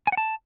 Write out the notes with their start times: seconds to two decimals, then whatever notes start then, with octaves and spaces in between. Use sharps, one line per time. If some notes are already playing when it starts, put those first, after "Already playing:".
0.07 G#5
0.12 F#5
0.17 A5